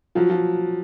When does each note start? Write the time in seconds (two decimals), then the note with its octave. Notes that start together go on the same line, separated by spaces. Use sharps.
0.15 F3 F#3
0.29 F3